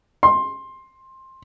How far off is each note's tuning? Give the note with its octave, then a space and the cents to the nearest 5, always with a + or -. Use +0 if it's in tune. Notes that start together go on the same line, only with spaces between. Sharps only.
C6 +15